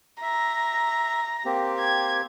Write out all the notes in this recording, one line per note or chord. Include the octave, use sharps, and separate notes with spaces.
E5 A#5
A#3 C4 G4
G#6